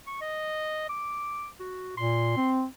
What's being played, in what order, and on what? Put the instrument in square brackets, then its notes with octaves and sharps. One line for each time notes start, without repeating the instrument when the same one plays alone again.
[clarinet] C#6
D#5
D6
F#4
[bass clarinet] A#2 [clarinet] C6
[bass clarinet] C4